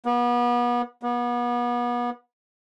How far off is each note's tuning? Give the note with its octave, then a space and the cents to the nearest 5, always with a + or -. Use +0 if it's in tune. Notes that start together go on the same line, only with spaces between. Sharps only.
B3 -35
B3 -35